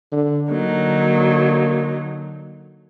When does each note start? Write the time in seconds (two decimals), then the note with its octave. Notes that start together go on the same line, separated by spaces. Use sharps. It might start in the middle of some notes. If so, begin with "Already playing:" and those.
0.12 D3
0.52 D3 F#3 A#3 D#4